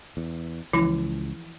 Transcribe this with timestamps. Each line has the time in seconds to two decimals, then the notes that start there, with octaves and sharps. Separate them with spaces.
0.17 E2
0.73 C#2 E3 F3 E4